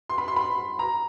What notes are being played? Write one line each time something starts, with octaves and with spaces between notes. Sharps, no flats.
C6
B5
C6
B5
A#5